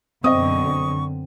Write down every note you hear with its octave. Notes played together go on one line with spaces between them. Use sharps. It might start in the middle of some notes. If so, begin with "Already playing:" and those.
F#2 B2 D3 C4 D#5 C#6 D#6